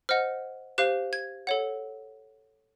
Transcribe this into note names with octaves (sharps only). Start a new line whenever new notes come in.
C5 D#5 F#5 F6
G4 C5 F5 F#6
G#6
A4 C#5 F#5